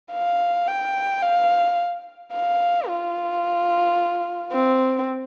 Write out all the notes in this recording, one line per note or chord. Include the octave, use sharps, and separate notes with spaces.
F5
G5
F5
F5
F4
C4